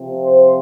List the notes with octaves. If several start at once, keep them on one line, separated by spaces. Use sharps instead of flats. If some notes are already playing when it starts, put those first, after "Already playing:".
Already playing: C3 F3 C4
C5